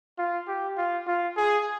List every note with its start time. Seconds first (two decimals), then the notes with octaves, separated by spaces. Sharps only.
0.18 F4
0.47 G4
0.77 F4
1.07 F4
1.37 G#4